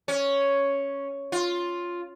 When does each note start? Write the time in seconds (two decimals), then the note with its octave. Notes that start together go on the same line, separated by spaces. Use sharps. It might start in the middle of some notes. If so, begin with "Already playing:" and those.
0.08 C#4
1.32 F4